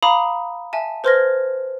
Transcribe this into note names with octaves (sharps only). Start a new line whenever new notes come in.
F5 A#5 B5 D6 D#6
E5 G#5 A5
B4 C5 C6 F6 G#6 A#6